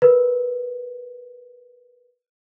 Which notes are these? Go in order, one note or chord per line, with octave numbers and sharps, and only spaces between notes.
A#4 B4